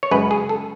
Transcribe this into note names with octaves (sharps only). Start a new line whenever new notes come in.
C#5
F#2 C#3 G#3 B4
G#4
A4